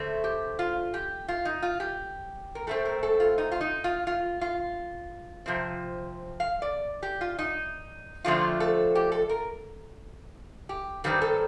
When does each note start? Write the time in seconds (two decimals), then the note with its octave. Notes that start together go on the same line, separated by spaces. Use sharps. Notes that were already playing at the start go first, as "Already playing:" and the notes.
Already playing: D3 A3 C4
0.24 G4
0.59 F4
0.94 G4
1.28 F4
1.45 D#4
1.62 F4
1.80 G4
2.55 A#4
2.67 A2 A3 C4 A4
2.85 A#4
3.03 A4
3.20 F4
3.38 D#4
3.52 F4
3.61 D#4
3.84 F4
4.07 F4
4.41 F4
5.46 C3 F3 C4
6.40 F5
6.62 D5
7.03 G4
7.21 F4
7.39 D#4
8.24 F2 D3 F3 A3 C4 F4
8.60 A4
8.95 G4
9.12 A4
9.29 A#4
10.69 G4
11.04 G2 D#3 G3 C4 G4
11.22 A4